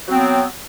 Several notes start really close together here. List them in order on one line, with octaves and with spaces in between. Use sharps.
F#3 C4 B3